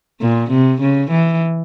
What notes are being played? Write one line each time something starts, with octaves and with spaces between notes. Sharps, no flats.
A#2
C3
C#3
E3